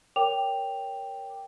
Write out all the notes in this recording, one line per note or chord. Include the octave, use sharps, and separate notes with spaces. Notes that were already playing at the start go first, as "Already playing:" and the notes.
A#4 C#5 G5 D6 F7